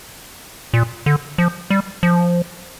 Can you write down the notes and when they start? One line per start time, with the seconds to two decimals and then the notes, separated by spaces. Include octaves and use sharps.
0.74 A#2
1.06 D3
1.38 F3
1.70 G3
2.03 F3